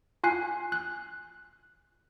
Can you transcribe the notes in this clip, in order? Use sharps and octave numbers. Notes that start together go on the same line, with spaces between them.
F4 G#5 F#6 C7
F#6